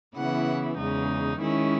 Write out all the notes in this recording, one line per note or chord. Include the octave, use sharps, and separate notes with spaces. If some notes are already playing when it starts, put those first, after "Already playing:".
C#3 E3 B3 E4 F#5
E2 C#3 G#3 D#4
D#3 G#3 C#4 E4